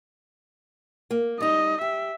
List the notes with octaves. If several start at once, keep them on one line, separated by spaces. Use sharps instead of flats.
A#3
G3 D#4 D#5
G4 E5